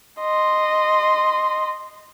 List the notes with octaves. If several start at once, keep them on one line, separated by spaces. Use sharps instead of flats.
D#5 C6